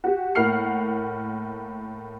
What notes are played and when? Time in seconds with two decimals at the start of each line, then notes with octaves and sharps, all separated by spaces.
0.04 F#4 G4
0.35 A2 A#3 F#5 F6 C7